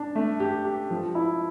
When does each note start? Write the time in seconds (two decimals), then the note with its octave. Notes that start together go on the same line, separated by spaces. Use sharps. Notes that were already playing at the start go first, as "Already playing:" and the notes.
Already playing: D4
0.15 A3
0.40 G4
0.65 G4
0.91 F3
1.15 E4